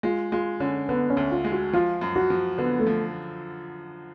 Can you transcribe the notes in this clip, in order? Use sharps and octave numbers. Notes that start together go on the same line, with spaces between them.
G#3 F4
G#3 F4
D3 C#4
D3 B3
C#4
D2
F4
G#3
F#4
F3 F4
F#2
F#4
F3
D3 B3
A3
F3